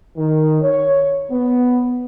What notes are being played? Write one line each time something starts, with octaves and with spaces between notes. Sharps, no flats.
D#3
C#5
B3